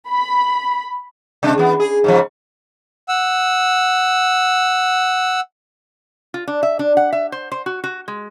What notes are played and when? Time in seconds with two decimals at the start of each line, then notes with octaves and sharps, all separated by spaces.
0.11 B5
1.43 C3 G#3 D4
1.58 E3 B3
1.80 G#4
2.04 G#2 C#3 F3
3.09 F#5 E6
6.34 F4
6.48 D4
6.63 E5
6.79 D4
6.97 F#5
7.13 E5
7.32 C5
7.52 C5
7.66 F#4
7.84 F#4
8.08 G#3